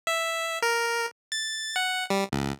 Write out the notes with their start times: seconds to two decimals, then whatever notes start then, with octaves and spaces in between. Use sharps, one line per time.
0.07 E5
0.62 A#4
1.32 A6
1.76 F#5
2.10 G3
2.32 C#2